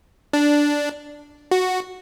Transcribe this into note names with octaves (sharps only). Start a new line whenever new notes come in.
D4
F#4